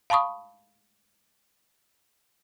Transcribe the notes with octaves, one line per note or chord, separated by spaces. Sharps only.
F5 A5 B5 C#6 D#6